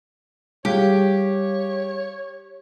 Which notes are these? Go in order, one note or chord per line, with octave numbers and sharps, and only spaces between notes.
G3 G4 G#4 C#5 F5